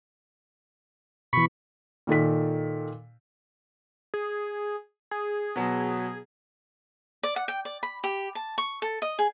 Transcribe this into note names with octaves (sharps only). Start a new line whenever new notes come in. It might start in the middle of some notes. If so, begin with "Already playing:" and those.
B2 E3 B5 C#6
A#2 D#3 A4 B6
G#4
G#4
B2 F#3
D5
F#5
G5
D5
B5
G4
A5
C#6
A4
D#5
G#4